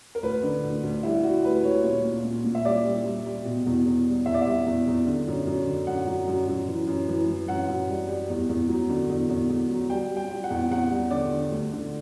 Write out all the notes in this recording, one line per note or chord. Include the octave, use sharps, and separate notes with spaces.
A#4
D2 B4
D3
D2
D2
G3 E4
G3 F#4
D2 B4
D2 C#5
A#2 C#5
A#2
A#2
A#2
E5
G3 D5
G3
G3
G3
B2
E2
E2
G3
E2 E5
D5
G3 E5
E2
E2
D3
F#2
F#2
D3
F#2 F#5
F#3
F#2
F#2
E3
F#2
E3
E3
F#2 F#5
F#2
G3
G3
E2
E2
F#3
D3
E2
E2
E2
F#3
G3 G5
G3
G5
G3
F#5
E2
E2 F#5
G3
D3 D5
D3
D2
D3